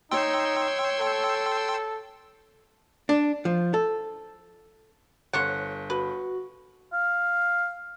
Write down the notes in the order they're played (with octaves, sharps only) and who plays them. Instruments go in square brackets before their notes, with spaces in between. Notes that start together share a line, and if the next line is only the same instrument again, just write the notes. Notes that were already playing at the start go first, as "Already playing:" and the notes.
[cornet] D#4 [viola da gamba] C#5 [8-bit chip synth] G5 C6 E6
[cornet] A4
[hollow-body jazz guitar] D4
F3
A4
[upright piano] G1 [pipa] C5 C#5 F#5
[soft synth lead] F#4 [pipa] B4
[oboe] F5